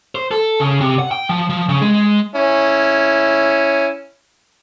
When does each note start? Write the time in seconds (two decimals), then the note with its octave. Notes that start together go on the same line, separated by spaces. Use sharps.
0.15 C5
0.31 A4
0.60 C#3
0.81 C3
0.99 F#5
1.11 G5
1.29 F3
1.50 F3
1.69 C#3
1.81 G#3
2.35 C#4 E4